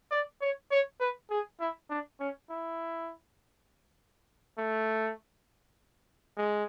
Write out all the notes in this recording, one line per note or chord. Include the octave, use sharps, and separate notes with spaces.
D5
C#5
C#5
B4
G#4
E4
D4
C#4
E4
A3
G#3